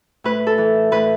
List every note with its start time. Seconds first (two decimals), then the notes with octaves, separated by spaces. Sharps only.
0.24 A2 B4
0.47 A4
0.58 E3
0.92 A2 B4